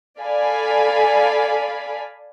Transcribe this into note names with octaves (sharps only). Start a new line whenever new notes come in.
A4 D5 F5 G#5 B5